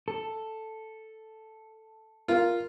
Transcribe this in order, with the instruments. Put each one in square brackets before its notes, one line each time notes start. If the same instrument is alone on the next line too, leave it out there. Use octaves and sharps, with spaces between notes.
[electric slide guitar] A4
[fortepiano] F4 [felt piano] A#4